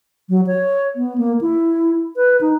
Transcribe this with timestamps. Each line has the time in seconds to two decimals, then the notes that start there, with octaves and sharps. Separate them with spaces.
0.29 F#3
0.47 C#5
0.96 B3
1.18 A#3
1.41 E4
2.16 B4
2.41 D#4